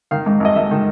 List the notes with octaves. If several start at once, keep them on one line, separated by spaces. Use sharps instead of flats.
D#3 F5
G#2
G#1 D#5
G#1 E5
D#3